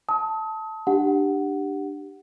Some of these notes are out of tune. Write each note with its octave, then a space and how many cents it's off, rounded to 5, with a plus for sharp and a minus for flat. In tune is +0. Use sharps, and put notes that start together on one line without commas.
A5 +0 D#6 +35
D4 +20 G4 +0 F#5 +0